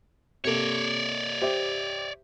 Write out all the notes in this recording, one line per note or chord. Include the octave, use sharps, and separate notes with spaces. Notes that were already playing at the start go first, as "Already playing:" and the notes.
C3 A#3 A4 C#5 D5
G4 C5 E5